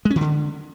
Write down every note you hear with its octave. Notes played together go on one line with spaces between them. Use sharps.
G#3
C#4
D#3
D3